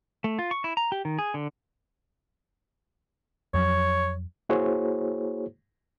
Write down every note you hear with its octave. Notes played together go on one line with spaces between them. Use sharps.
A3
F4
C#6
E4
A#5
G4
D#3
G#4
D3
F2 F#3 C#5
A#3 E4 F#4 G#4 C5 C#5